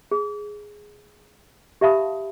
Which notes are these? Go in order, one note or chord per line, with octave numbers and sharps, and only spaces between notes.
G#4
G4 E5 F5 A5 B5 D#6